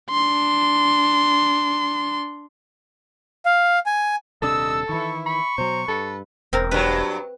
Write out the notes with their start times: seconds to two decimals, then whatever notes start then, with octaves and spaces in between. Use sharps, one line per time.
0.11 D4 C6
3.46 F5
3.86 G#5
4.42 D#1 C3 D4 A4 D#5 E6
4.89 D#3 E3 E4 C#6
5.26 B5 C#6
5.58 B2 F#3 C5 A#5
5.88 G2 A4 B4
6.53 E1 C4 A#4
6.71 G2 F#3 B4 G5